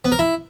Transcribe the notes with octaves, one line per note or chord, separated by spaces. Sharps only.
B3
A#4
E4